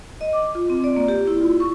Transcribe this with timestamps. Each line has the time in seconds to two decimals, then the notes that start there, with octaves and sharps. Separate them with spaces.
0.21 D#5
0.33 D6
0.55 F4
0.70 C4
0.84 D5
0.96 A#3
1.08 G4
1.27 E4
1.41 F4
1.60 C#6